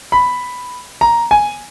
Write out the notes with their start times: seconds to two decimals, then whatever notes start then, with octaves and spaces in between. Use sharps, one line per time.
0.12 B5
1.01 A#5
1.31 G#5